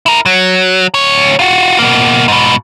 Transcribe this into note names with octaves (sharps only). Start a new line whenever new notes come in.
E4 A#4
F#3
D2 C#5
F4 F#4
B2 A#3
G#2 B2